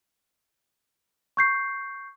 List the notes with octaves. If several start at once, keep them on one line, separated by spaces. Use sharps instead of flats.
C#6 G6 C7